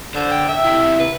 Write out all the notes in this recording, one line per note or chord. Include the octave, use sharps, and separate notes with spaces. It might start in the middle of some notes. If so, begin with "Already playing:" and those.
D3 C5
G5
E5
C3 E4
B4